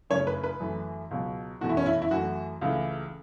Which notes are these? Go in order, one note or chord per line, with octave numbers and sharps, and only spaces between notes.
F#2 C#3 A3 C#5
B4
B4
F#2 E3 A3
C#2 B2 F#3
E2 B2 A3 F#4
E4
C#4
E4
E4
F#2 E3 A3 F#4
C#2 C#3 E3 A3